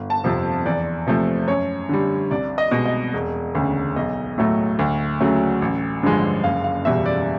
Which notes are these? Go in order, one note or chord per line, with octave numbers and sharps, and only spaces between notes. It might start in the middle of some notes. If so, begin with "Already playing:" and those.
Already playing: G1
A5
F2 C3 F3
E2 D5
C3 F3 A3
F#2 C#5
D3 G3
C2 D5
D#5
B2 G#3
D#5
E1
D2 C#3
B1 D#5
A2 F#3 A3
D2
C#3 F#3 A3
A1
G2 D3 F3 G#3
F#1 F5
F5
E2 B2 G3 E5
D5